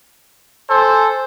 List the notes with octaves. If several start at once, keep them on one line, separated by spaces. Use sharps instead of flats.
A4 C5 G#5